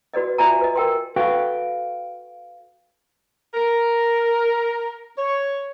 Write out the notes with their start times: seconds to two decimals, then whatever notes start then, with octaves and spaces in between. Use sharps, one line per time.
0.14 F#4 B4 D5 D#5
0.38 F4 F#4 D5 E5 G#5 A#5
0.61 B4 D#5
0.76 A#4 G5 C6
1.16 F#4 A4 B4 F5 G5
3.55 A#4
5.16 C#5